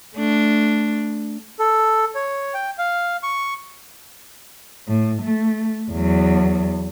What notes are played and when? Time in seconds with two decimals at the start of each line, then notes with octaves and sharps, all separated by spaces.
0.15 A3 D4
1.59 A4
2.15 C#5
2.54 G5
2.78 F5
3.23 C#6
4.88 A2
5.23 A3
5.91 E2 F#3